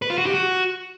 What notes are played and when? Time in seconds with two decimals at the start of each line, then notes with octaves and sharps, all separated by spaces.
0.02 B4
0.10 F4
0.18 F#4
0.26 G4
0.34 F#4